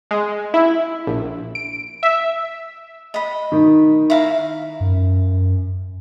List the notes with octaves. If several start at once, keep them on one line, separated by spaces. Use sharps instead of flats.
G#3
E4
A#1
D7
E5
D#5 B5
D#3
E4 F5 A#5
F#2